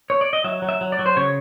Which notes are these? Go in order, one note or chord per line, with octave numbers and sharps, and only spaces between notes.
C#5
D5
D#5
F#3 E5
F#3
E5
F#3
D5
F#3
C5
C#3 C#5